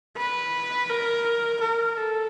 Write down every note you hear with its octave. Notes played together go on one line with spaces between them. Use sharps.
B4
A#4
A#4
A4